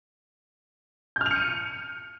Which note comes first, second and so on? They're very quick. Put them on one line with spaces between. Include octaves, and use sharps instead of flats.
G6 F6 F7 C#7 D#7